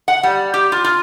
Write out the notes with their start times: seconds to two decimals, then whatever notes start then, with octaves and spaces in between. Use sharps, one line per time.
0.08 F#5
0.23 G3
0.54 G4
0.72 F4
0.84 F4